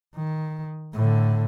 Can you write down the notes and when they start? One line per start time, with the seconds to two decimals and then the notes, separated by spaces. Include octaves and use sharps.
0.15 D#3
0.94 A2 D3